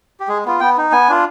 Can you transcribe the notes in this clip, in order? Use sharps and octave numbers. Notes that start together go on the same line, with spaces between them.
G4
G#3 G#4
B3 F4
B3 G5
D#4
B3 G#5
D4 F4